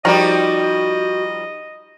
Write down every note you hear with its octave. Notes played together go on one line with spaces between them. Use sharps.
D#3 F3 G3 D#4 F#4 G4 D#5